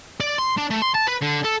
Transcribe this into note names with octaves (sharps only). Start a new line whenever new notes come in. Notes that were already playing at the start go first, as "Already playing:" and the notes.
D5
C6
D4
A3
C6
A5
B4
D3
A4